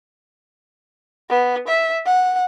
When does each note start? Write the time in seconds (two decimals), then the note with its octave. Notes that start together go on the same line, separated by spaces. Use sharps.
1.30 B3
1.68 E5
2.06 F#5